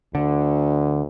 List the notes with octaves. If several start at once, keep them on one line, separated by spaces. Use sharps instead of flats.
D2 D3